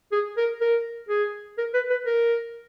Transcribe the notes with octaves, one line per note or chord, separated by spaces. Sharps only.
G#4
A#4
A#4
G#4
A#4
B4
B4
A#4